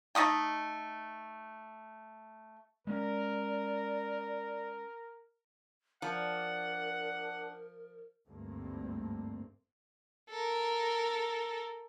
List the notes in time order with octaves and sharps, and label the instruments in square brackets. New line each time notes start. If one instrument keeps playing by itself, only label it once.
[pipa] A3 D#4 D#5 G5
[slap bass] G#3 C#4 [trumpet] A#4 [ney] D5
[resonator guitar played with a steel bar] F3 [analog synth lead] D4 [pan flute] A#4 [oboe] F#5
[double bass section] G#1 D2 G2 A3 A#3 C4
[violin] A4 A#4